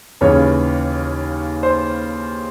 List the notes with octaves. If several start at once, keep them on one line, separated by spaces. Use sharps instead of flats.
D#2 C#3 E3 C#5
C5